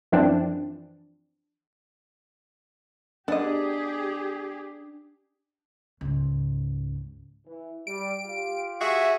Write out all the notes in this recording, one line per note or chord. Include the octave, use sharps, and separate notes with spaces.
F#2 E3 F3 C4 D4
B3 D4 G4 G#4 D#5
C#2 G#2
E3
G3 D7
F4 G4 F5
F#4 G#4 E5